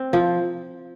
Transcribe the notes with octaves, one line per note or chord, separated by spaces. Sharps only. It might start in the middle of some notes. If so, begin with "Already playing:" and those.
Already playing: C4
F3